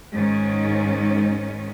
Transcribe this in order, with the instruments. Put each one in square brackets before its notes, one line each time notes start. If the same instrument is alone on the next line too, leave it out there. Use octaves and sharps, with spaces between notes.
[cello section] G#2 D#3 C#4